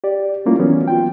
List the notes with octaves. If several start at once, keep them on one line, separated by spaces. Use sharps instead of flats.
G4 D5
G3 A3 A#3 C#4 E4 F4
E3 F#3 B3 C#4 F#4
F4 G5